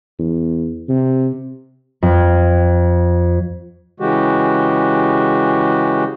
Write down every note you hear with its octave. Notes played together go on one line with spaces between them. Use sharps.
E2
C3
F2
C#3 E3 G#3 F#4 G4